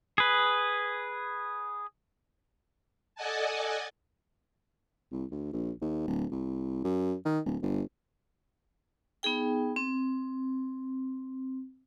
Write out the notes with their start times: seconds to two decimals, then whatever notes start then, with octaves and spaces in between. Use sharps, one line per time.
0.18 G#4 B4
3.15 A4 D5 D#5 F#5 G#5 A5
5.12 C2
5.31 D2
5.53 A#1
5.81 D#2
6.07 D1
6.32 C2
6.84 F#2
7.25 D#3
7.46 D1
7.62 G1
9.23 B3 D#4 G#4 G5
9.76 C4